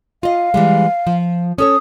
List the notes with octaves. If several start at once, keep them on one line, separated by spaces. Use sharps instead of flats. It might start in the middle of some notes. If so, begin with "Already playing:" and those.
F4 D#5 F5
E3 G3 G#3
F3
C#4 A4 C#5 D#6